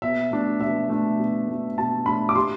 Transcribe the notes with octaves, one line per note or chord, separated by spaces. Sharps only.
B2 E5
A3 D4
B2 E5
A3 D4
B2
A3 D4
B2 A5
A3 D4 B5
D6
C3 C6